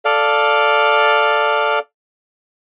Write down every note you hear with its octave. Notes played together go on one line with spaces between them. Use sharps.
A4 D5 F5